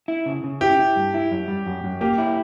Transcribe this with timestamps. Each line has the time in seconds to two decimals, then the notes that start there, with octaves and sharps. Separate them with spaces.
0.08 E4
0.26 C#3
0.44 C#3
0.61 E4 G4
0.79 E4
0.96 G2
1.14 E4
1.31 F#2
1.48 G3
1.67 F#2
1.84 F#2
2.01 A#3 G4
2.18 E4